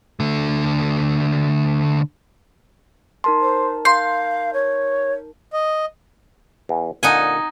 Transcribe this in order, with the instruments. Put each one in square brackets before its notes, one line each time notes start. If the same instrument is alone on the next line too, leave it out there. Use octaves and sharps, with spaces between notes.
[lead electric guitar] D3 A3
[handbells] D#4 A#4 A5 [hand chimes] C6
[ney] C5
[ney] F5 [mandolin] C6 [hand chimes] G6
[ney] C#5
[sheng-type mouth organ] D#5
[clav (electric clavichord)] E2
[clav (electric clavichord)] A#2 D3 [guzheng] D#4 F#5 G#5